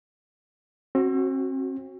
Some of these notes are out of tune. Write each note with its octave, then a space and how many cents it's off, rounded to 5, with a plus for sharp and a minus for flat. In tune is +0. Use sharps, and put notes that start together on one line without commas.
C4 +40 F#4 +0